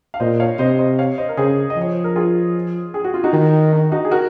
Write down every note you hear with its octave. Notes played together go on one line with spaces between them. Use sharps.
F5
A#2 C5 D#5
C#5 F5
C3 C5 D#5
C5 D#5
C#5 F5
C5 D#5
A#4
C#3 G#4 C5
D#5
F3
C#5
C5
A#4
F4 G#4
G#4
F#4
F4
D#4 F#4
D#3
D#4
D#4 F#4
G#4
F#4 A#4